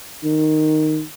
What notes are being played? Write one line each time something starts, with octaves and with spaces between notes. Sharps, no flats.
D#3